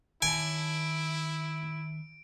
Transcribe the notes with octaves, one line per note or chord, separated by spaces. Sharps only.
D#3 E4 G#5 A5 D7